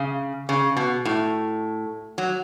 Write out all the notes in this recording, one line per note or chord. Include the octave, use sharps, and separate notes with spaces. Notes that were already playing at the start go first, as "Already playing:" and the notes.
Already playing: C#3
C#3
B2
A2
F#3